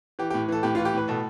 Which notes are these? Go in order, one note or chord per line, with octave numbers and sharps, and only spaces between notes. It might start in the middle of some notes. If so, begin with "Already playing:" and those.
E3 G4
A2 G4
E3 A4
A2 G4
E3 F4
G4
A2 B4
B2 A4